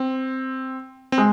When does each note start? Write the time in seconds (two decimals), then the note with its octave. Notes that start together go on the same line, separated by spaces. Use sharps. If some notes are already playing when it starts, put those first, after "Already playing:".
Already playing: C4
1.12 C4
1.18 G#3